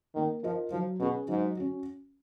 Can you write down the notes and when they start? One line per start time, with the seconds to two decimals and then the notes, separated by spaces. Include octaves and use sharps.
0.15 D#3 A#3
0.44 F3 F4 A#4 D#5
0.71 F3 F#3
1.00 B2 C#4 G#4
1.28 G#2 F#3
1.57 C#4 F#4